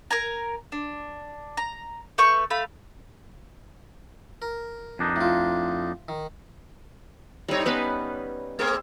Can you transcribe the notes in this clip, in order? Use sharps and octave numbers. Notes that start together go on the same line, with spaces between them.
A#4 G#5 A#5
D4
A#5
A3 B4 C#6 G6
A3 F5 B5
A#4
F2 D4 D#4
A2 F4
D#3
G#2 G3 C4 D#4 C#5
G3 B3 C#4 B4
A3 C4 G#4